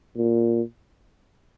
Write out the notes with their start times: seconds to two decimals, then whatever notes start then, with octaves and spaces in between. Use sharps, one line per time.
0.17 A#2